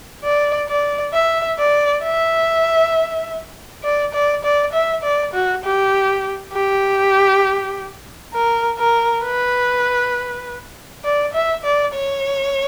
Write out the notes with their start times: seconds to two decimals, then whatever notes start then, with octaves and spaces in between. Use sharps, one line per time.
0.24 D5
0.69 D5
1.13 E5
1.59 D5
2.03 E5
3.83 D5
4.13 D5
4.44 D5
4.73 E5
5.03 D5
5.34 F#4
5.64 G4
6.53 G4
8.33 A#4
8.78 A#4
9.24 B4
11.04 D5
11.33 E5
11.64 D5
11.94 C#5